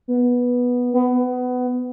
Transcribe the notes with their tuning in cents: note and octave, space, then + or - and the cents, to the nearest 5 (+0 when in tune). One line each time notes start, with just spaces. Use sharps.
B3 -10
B3 +20